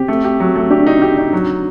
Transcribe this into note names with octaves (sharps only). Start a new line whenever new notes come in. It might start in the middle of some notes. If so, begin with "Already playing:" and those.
Already playing: C4 G4
A3
G4
F#3
A3
D4 G4
D#4
G4
D#4
F#3